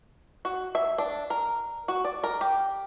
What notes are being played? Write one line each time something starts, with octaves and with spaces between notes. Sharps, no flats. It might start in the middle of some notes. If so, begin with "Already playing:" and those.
F#4
E5
D4
A#4
F#4
D5
A#4
G4